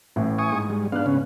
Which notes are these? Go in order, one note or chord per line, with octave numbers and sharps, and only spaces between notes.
A1 A2 E3
G#5 C#6 D#6
G#2
G3 G#3
G#2 B3 D4 F5 F#6
C#3 B3 C#4